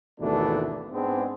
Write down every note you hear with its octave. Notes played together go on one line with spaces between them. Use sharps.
G#1 D#2 B2 E3 A3 D4
G#2 G#3 B3 C4 D4